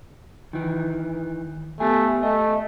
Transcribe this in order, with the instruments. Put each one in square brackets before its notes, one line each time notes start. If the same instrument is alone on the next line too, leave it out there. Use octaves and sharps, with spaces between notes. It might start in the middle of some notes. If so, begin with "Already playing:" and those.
[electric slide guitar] D#3 E3
[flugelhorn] A3 [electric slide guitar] B3 G4 G#5
[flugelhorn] A3 [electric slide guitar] D#5